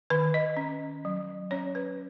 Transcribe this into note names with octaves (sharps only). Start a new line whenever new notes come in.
D#3 B4
D#5
C#4
F#3
C#4 C#5
B4